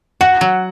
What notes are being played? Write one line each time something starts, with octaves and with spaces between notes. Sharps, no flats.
F#4 F#5
F#3